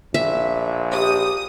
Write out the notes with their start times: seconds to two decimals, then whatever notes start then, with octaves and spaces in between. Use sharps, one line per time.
0.14 A#1 E5
0.93 G4 D#6